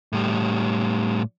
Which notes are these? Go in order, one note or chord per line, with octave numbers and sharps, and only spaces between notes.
A2 G3